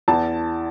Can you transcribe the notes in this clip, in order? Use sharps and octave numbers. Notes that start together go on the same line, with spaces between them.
E2 A5